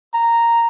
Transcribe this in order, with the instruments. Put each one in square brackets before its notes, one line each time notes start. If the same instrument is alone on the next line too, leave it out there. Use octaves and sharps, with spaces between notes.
[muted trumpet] A#5